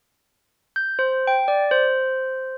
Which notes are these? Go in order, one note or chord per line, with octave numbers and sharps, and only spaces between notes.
G6
C5
G5
D5
C5